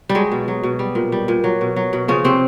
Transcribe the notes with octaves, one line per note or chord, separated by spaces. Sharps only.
G3
F#3 G#3
B2
F#3
B2
G3
A#2
G3
A#2
F#3
B2
F#3
B2
C#3 F3 C#4
C3 C4